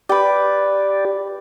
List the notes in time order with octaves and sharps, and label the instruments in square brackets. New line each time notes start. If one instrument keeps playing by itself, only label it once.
[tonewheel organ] G4 D5 [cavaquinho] B4 G5